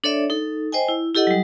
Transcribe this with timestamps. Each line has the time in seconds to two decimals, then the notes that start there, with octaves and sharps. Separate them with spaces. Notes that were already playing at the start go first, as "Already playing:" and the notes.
0.04 D4 A4 C#5 D5 E5
0.30 D#4 A4
0.72 C5 D#5 G5 G#5
0.89 E4
1.14 E4 G4 A4 D#5 F#5
1.27 F#3 G3